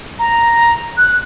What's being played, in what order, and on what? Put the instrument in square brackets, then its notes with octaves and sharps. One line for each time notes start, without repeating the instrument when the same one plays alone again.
[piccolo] A#5
F#6